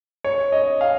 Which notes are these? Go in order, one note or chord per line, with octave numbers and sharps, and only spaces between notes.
C#5
D#5
F5